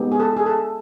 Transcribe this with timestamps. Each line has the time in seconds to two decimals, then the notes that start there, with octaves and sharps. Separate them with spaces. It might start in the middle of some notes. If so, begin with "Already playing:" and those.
Already playing: G#3 B3 D#4 G4
0.12 G#4
0.20 A4
0.37 G#4
0.46 A4